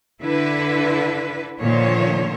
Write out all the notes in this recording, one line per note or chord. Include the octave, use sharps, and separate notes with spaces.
D3 E4 B4
A#2 D3 D#3 F3 C5 C#5